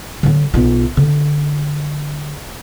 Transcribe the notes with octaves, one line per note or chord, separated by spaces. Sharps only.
D3 F#3
B1 F4
D3